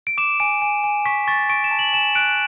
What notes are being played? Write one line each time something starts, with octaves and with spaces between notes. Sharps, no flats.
D7
D6 E7
G#5 D7
G#5
G#5
C#6 B6
C#6 A6
C#6 D7
E7
A5
F#7
G#5 E7
F#6 D7